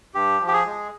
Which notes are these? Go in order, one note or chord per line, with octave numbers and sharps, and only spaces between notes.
G2 G4
F3
G4
G#4
G#3